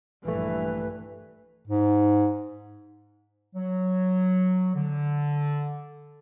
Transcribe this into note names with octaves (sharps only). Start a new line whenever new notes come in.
A#1 G2 E3 A3 B4
G#2
F#3
D3